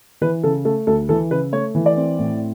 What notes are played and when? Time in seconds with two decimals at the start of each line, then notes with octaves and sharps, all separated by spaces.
0.21 E3 B4
0.44 C#3 A4
0.65 A3 A4
0.87 D2 A4
1.09 E3 A4
1.30 C#3 B4
1.52 A3 C#5
1.75 E3
1.86 D5
1.97 C4
2.19 A2